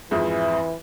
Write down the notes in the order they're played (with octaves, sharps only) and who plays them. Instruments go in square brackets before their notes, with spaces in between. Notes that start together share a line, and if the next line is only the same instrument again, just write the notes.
[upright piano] F2 G#2 [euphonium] E3 [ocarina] E5